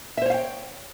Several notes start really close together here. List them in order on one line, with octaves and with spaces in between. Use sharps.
E5 C5 C#5 F5 G5